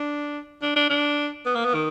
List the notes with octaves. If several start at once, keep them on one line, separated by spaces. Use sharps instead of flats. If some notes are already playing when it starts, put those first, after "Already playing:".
Already playing: D4
D4
D4
D4
B3
A#3
B3
D#3